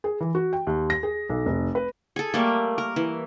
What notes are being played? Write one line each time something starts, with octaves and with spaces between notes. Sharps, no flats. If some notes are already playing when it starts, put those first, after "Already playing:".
G#4
E3
F#4
G5
D#2
A#6
G#4
B1
F1
B4
G#4 A4
G3 A3 A#3
A#4
E3